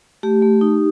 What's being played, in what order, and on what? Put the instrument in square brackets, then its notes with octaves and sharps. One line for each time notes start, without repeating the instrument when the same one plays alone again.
[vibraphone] A3 G4
A3
D#4